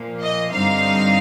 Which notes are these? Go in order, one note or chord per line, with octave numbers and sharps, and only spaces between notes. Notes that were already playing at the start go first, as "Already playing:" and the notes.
Already playing: A#2 F3 A#3
D#5
G2 D3 G3 C4 D#4 F5